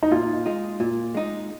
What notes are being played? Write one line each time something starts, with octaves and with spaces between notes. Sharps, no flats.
D#4
A#2 F4
G#3 D#4
A#2 F4
G#3 D#4